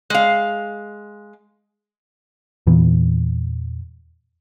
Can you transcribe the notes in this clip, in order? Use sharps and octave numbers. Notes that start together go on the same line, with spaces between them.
G#3 F5
E2 A#2 E3